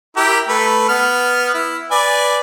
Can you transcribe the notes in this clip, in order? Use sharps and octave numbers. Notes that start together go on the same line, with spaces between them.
E4 G4 A#4
A3 B4
B3 F6
E4
B4 D5 G#5